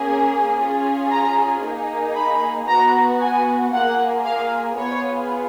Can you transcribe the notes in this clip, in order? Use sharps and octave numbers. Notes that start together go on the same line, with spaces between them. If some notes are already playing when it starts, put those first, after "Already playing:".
Already playing: A#3 C#4 G#4
C#4 F4 G#4
A#5
A#3 D#4 G#4
B5
B3 F#4 A#5
G#5
A#3 F4 G#4 F#5
F5
B3 F4 G#4 C#5